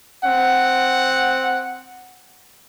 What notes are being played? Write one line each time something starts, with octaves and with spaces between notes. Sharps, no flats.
C4 F#5